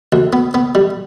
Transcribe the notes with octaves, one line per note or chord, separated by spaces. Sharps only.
D2
B3
B3
G3